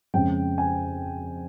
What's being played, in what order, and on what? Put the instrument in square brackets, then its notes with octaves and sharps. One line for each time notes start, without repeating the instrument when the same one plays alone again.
[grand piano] F2 C#3 G#3 C#4 G5
G#5